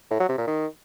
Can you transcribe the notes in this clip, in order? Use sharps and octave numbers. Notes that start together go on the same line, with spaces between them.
A2
F#3
C3
A#2
D#3